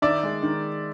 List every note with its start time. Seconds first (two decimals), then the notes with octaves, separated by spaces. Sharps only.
0.02 D#3 D5 E5
0.23 G#3
0.43 D#3